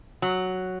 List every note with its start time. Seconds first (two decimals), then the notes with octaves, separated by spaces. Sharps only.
0.22 F#3